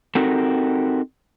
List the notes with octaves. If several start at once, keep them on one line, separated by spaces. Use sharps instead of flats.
C4 D#4 F#4 G4 A4 A#4